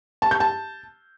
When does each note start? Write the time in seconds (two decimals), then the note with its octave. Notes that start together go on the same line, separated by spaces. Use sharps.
0.22 A5
0.31 G6
0.40 A5